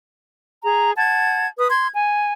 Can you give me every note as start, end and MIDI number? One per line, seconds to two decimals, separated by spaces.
0.64 0.92 68
0.64 0.92 82
0.97 1.47 78
0.97 1.47 81
0.97 1.47 92
1.58 1.67 71
1.58 1.67 87
1.70 1.87 84
1.70 1.87 92
1.95 2.33 80